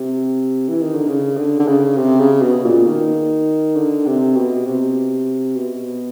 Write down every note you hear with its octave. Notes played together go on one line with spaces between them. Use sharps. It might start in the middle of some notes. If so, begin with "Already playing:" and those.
Already playing: C3
E3
D#3
D3
C#3
D3
D3
C#3
C3
C#3
B2
A#2
D#3
D3
C3
B2
C3
B2